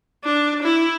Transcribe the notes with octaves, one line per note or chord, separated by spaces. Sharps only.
D4
E4